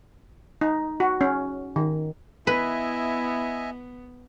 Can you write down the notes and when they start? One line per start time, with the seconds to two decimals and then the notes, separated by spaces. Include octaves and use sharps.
0.61 D#4
1.00 F#4
1.21 C#4
1.76 D#3
2.47 B3 E4 B4 D#5 E5 G#5